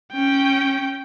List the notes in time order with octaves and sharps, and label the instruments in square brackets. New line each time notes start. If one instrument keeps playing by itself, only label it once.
[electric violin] C#4 G5